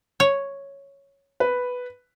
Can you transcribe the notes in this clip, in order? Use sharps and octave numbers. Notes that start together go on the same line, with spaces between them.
C#5
B4